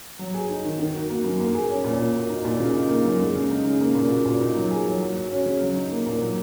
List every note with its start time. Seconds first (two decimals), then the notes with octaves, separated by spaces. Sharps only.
0.19 F#3
0.34 G#4
0.49 D#4
0.64 D#3
0.79 D#3
0.94 F#4
1.09 A#3
1.24 F#2
1.40 A#3
1.55 G#4
1.69 C#4
1.84 A#2
2.00 A#3
2.15 F#4
2.30 D#4
2.45 A#2
2.60 C#3
2.74 D#4
2.90 A#3
3.05 F#2
3.20 G#3
3.35 C#3
3.50 D#4
3.65 C#3
3.80 A#3
3.95 A#2
4.11 F#4
4.26 A#2
4.41 D#4
4.56 F#3
4.71 G#4
4.86 F#3
5.01 F#3
5.16 F#4
5.31 C#4
5.46 C#3
5.61 F#3
5.76 D#4
5.91 A#3
6.06 A#2
6.21 F#3